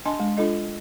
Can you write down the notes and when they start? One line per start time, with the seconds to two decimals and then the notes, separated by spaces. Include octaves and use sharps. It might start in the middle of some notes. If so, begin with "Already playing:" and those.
0.06 D4 D#5 G#5 A5 C6
0.20 G#3 D4
0.37 D4 F4 A4 D#5